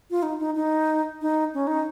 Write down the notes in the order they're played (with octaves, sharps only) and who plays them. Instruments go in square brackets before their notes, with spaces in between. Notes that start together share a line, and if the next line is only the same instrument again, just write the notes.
[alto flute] F4
D#4
D#4
D#4
D#4
C#4
D#4